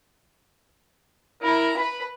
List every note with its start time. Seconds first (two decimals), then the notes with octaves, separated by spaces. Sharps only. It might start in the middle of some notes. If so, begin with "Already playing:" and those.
1.42 E4 A#4 A#5
1.77 B4 B5